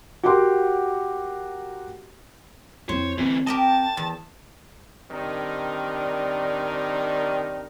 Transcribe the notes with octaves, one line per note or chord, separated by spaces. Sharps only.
F#4 G4 A#4 F#5 C6 D6
F2 E4 C5 C#5
D2 E3 C4
G4 A#4 D#5 A5
E2
D#3 G3 C4 D4 D#4 A#4